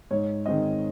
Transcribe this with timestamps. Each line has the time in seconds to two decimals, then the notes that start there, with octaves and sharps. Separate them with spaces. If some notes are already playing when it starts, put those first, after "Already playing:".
0.11 G#2 C#5
0.46 D#3 G#3 C4 D#5